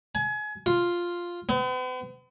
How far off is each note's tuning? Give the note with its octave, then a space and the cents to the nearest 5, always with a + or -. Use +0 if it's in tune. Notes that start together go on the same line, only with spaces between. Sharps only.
G#5 +30
F4 +0
B3 +45